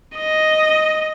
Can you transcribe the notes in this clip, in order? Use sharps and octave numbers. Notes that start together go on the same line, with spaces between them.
D#5